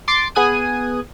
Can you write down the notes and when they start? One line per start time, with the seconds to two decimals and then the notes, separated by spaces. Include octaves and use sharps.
0.08 C6 D6 A6 C7
0.35 B3 G#4 G#5 D#6 F#6 D#7